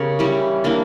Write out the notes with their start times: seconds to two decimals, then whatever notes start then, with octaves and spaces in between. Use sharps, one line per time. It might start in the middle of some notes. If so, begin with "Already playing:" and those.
Already playing: C#3 B3 G4 A#4 C#5
0.19 E3 G3 C#4
0.64 E3 A#3 D4